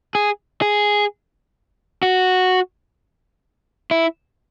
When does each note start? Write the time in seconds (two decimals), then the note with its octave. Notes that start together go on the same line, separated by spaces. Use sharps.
0.15 G#4
0.62 G#4
2.03 F#4
3.91 E4